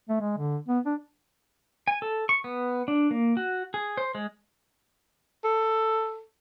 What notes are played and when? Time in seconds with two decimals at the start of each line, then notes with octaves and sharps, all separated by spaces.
0.09 A3
0.21 G#3
0.38 D3
0.68 B3
0.85 D4
1.88 G#5
2.02 A4
2.29 C#6
2.44 B3
2.88 D4
3.11 A#3
3.37 F#4
3.74 G#4
3.97 C5
4.15 G#3
5.44 A4